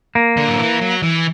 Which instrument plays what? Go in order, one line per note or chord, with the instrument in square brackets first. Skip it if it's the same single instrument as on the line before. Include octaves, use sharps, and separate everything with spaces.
[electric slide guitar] A#3
[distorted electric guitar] D3
F#3
E3
F#3
E3